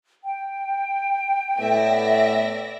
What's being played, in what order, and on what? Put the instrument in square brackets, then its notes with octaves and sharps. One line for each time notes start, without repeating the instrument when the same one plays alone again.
[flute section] G5
[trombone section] A2 B3 [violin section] D5 E5 A#6